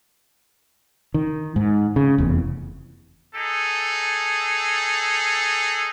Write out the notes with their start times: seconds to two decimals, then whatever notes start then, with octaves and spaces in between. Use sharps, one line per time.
1.14 D#3
1.56 G#2
1.96 C#3
2.18 F1 E2
3.35 D#4 G#4 A4